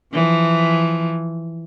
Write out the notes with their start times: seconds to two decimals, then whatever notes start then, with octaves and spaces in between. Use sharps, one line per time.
0.13 E3 F3